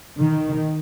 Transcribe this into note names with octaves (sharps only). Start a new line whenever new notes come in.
D#3